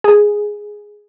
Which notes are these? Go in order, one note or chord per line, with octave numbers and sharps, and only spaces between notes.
G#4